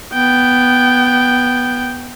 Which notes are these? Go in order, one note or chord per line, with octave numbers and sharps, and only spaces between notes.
B3 G5